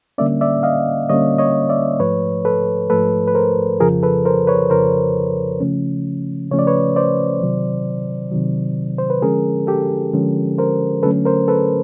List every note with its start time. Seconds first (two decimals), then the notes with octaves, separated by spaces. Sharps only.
0.18 D3 G3 A#3 C#4 D5 E5
0.41 D5 E5
0.63 D#5 F5
1.10 D3 G3 A#3 C#4 C#5 D#5
1.38 C#5 D#5
1.69 D5 E5
2.00 G#2 F3 A3 B4 C#5
2.45 A4 B4
2.90 G#2 F3 A3 A4 B4
3.27 B4
3.35 A#4 C5
3.80 F2 C#3 F3 G#4 A#4
4.03 A4 B4
4.25 A#4 C5
4.47 B4 C#5
4.70 F2 C#3 F3 A#4 C5
5.60 C#3 F3 A3 C#4
6.51 C#3 F3 A3 C#4 C#5
6.59 D5
6.67 B4 C#5
6.96 C5 D5
7.41 C3 D#3 F#3
8.32 C3 D#3 F#3
8.98 C5
9.10 B4
9.22 D3 F3 G#3 C#4 G#4 A#4
9.67 G4 A4
10.14 D3 F3 G#3 C#4
10.58 A#4 C5
11.03 D3 F#3 A3 C#4 A4 B4
11.25 A#4 C5
11.48 A4 B4